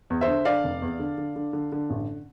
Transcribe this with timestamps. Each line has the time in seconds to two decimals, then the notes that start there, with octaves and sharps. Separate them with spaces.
0.10 E2
0.21 C5 E5
0.28 D3
0.45 D3 D5 F5
0.64 F1
0.82 E2
1.00 D3
1.18 D3
1.36 D3
1.53 D3
1.72 D3
1.90 A1